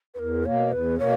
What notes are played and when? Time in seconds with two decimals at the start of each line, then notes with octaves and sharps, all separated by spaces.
0.14 B4
0.18 E2 A#4
0.45 B2 A#3 C#5
0.71 E2 B4
0.98 B2 A#3 C#5